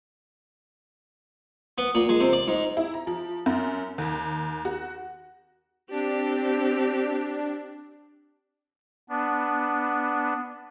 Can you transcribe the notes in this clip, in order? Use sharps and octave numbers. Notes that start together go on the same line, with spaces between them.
B3
A#2
G#3
C3
D5
G#2
E4
A#5
F3
F#2
D#2
F#4
C4 D4 G4
B3 D4